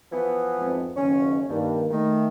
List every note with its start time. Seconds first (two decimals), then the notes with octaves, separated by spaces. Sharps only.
0.12 E3 F3 B3
0.59 F2 G#2
0.96 F#1 B1 D#3 C#4
1.49 G2 D#3 A#3
1.90 D#3 A3